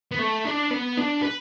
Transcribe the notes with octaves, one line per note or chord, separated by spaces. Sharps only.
B3
A3
D4
B3
D4
B4